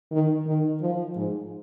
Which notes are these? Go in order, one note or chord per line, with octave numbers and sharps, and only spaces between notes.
D#3
D#3
F3
G#2